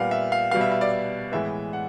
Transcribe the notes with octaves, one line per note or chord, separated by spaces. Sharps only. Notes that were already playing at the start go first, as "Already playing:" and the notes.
Already playing: A#2 G3 B3 F5 F#5
E5
F5
B2 G3 B3 F5
E5
E5
D5
D5
A2 E3 G#3 B3 E5
F#5